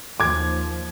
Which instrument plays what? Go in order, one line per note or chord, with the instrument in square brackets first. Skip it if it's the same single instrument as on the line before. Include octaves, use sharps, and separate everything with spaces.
[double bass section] D#2 F3 [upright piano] D6 G#6